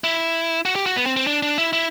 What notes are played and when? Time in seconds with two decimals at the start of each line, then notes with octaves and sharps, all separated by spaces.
0.04 E4
0.65 F#4
0.75 G4
0.86 F#4
0.96 B3
1.06 C4
1.16 C4
1.27 D4
1.43 D4
1.58 E4
1.73 E4